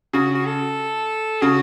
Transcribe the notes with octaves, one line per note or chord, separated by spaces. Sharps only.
C#3 F#4
F#4
A4
C#3 F#4